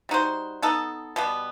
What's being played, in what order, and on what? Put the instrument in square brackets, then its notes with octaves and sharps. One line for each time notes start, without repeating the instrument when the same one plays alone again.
[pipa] G3 D#4 F#4 C5
B3 D#4 A4
B2 G3 B3